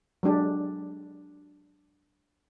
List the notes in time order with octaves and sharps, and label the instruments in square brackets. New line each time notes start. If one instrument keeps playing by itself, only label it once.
[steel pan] F#3 G#3 D4 G4